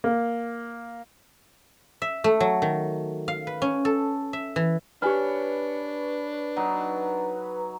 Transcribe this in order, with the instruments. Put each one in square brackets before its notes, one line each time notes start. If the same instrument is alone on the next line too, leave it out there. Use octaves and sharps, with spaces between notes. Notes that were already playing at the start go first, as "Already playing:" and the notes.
[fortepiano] A#3
[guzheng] E5
A3
F#3
D#3
F5
B4
C#4
A4
E5
E3
[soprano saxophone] D4 [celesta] G4 G#5 F6 [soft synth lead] B4 [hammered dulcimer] C#5 B5
[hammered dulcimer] F#3 D#4